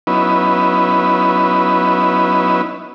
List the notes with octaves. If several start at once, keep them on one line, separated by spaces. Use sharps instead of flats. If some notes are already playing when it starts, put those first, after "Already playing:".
F#3 B3 C#4 D#4 E4 B4